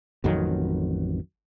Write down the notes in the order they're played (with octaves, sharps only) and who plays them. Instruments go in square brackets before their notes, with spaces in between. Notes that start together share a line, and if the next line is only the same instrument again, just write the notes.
[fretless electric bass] A1 F2 D#3 F#3